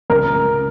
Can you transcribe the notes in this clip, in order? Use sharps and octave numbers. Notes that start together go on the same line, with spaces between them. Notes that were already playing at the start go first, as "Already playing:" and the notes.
C#2 A#4
C#3